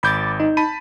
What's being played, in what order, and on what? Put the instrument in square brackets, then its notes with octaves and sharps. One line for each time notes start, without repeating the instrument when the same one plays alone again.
[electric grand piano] G#1 G6 [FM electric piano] B5 D6 A6
[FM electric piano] D#4
[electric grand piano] A5 B5 D#7